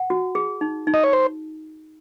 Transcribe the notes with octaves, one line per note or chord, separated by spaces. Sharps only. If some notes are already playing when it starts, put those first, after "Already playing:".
Already playing: F#5
F#4
G#4
D#4
D#4
D#5
C#5
C5